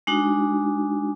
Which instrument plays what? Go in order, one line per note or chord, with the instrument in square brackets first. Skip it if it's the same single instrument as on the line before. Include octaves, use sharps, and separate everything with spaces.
[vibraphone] G#3 D4 D#4 F#4